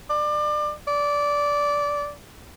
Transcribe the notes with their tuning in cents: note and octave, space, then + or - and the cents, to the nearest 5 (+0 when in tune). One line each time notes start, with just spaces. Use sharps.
D5 +30
D5 -15